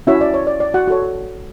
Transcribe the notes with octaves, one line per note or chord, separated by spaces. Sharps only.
C#4 E4 F#4 C#5 E5
D5
C#5
D5
D5
F#4 F#5
F#4 A4 C#5